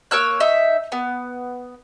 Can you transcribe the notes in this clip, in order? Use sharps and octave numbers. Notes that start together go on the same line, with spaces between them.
A#3 C#5 E6 F#6
D#4 E5
B3